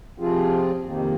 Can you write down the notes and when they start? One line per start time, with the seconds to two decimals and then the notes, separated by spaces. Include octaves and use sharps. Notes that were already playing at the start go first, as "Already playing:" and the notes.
0.18 C3 F3 C4 F4 G#4
0.84 F2 C3 D#3 A#3